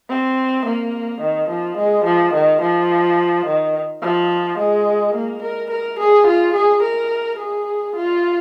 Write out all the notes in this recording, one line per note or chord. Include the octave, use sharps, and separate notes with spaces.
C4
A#3
D#3
F3
G#3
F3
D#3
F3
D#3
F3
G#3
A#3
A#4
A#4
G#4
F4
G#4
A#4
G#4
F4